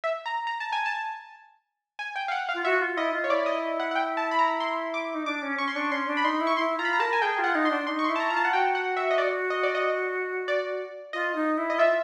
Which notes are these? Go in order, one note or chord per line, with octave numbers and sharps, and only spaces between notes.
E5
A#5
A#5
A5
G#5
A5
G#5
G5
F5
F#5
F5
F4
F#4 E5
F4
E4 D#5
F4
C#5
E4 D5
D#5
F#5
F#5
G5
A5
B5
A#5
C6
D6
D#4
D4 D6
C#4
C#4 C#6
C6
D4 C#6
C#4 C6
D4
B5
D#4 C6
E4
C#6
E4 C6
F4 A#5
B5
A#5
A#4 A5
G#5
G#4 G5
F4
F#5
D#4
C6
D4
D#4 C6
C#6
C6
E4
A5
A#5
F4 A#5
A5
F#5
F#4 G5
F#5
E5
D#5
D5
D#5
D5
D#5
D5
F4 D#5
D#4
E4
D#5
F4 E5